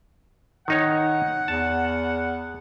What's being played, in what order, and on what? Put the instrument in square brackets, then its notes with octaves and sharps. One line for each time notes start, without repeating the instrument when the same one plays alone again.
[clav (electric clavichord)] D#3 D#4 C#5 [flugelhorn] F#5
[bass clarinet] E2 [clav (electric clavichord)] A5